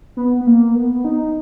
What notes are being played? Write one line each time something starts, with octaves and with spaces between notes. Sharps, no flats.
B3
B3
A#3
B3
D#4